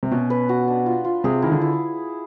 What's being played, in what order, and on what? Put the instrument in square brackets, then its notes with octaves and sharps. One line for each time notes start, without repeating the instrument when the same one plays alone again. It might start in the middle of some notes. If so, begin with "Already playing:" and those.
[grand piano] C3
[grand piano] B2 [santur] C#4
[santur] B4
F#4
D4
F4
F4
[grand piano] C3 [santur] G#4
[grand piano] D#3 [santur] E4
[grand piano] D3
[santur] E4